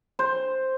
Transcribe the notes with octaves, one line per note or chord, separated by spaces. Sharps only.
C5